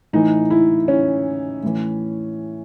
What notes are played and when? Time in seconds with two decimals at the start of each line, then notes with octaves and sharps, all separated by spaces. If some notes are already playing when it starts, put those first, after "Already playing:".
0.13 A2 E3 D#4
0.50 E4
0.88 C#4
1.63 A2 E3